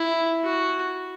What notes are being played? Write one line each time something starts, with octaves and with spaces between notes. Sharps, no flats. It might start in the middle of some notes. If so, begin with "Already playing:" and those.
Already playing: E4
F#4